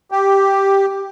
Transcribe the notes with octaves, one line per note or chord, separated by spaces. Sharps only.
G4